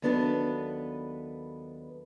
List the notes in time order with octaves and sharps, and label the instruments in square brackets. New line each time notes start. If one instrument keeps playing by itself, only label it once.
[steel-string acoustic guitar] D#2 F#3 B3 D4 A4 B4